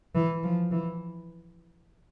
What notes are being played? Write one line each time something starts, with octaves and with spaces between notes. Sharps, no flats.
E3
F3
E3